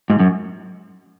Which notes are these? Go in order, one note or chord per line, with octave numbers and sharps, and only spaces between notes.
G#2
F#2